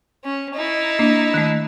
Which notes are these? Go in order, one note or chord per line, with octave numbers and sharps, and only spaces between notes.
C#4
D#4 E4
A#3 D4
D#3 A3